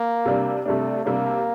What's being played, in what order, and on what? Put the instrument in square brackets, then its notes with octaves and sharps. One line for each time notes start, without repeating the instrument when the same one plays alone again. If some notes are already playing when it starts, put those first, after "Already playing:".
Already playing: [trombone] A#3
[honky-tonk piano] C3 G3 D4
[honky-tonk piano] C3 G3 D4 [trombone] A3
[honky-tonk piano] C3 G3 D4 [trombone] A#3